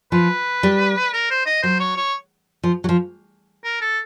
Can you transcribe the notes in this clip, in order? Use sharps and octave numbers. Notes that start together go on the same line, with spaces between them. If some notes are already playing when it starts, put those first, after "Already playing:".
F3 B4
G3
A#4
C5
D#5
F#3 C5
C#5
C#5
F3
F#3
F3
A#4
A4